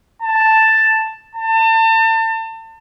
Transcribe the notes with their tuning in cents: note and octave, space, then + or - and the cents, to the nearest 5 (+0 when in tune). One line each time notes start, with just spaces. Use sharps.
A5 +5
A5 +35